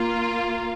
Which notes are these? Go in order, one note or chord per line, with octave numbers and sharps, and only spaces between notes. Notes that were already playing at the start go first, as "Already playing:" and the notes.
Already playing: A#3 F4